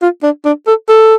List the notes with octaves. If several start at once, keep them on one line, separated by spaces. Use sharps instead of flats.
F4
D4
D4
A4
A4